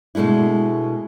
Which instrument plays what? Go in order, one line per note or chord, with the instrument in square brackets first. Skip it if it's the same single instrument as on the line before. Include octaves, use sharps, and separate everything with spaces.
[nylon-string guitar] B2 G#3 A3 D4 E4